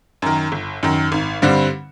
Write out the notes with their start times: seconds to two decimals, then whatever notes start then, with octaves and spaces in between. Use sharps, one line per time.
0.22 F#2 D#3
0.52 G1
0.83 F#2 D#3
1.12 G#1
1.42 G2 D3 G3 C4